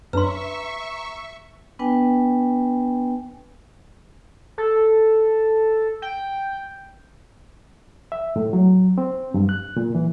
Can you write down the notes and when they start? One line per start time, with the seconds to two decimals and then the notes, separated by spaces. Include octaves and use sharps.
0.13 F#2 D4 B4 C#5 E5 A#5 C6 C#6
1.79 B3 D4 B4 G5 G#5
4.58 A4
6.02 G5
8.12 E5
8.36 A2
8.53 F#3
8.98 C4
9.34 G2
9.49 F#6
9.77 A#2
9.95 E3